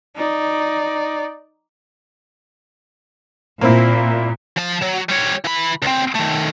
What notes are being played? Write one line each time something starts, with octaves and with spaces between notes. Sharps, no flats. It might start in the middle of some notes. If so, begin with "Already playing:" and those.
D#4 D5
A#2 A#3 C4 E4
F3 A5
F#3
G3 C#5
E3 B5
C#2 C4
D#3 A3